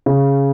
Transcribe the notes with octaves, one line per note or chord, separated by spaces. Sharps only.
C#3